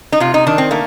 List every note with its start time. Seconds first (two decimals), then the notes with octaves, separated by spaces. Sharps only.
0.12 D#4
0.20 C3 F4
0.34 D#4
0.47 D#3 D4
0.58 C4
0.71 A3 A#3